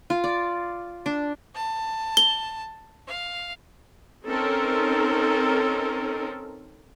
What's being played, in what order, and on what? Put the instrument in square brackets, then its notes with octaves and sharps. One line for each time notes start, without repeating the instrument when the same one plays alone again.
[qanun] F4
D5
D4
[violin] A5
[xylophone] G7
[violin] F5
[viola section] C4 C#4 D#4 A4 A#4